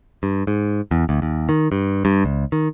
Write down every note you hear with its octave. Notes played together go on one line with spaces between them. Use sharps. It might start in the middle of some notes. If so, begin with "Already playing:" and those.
G2
G#2
E2
D2
D#2
D#3
G2
G2
C#2
D#3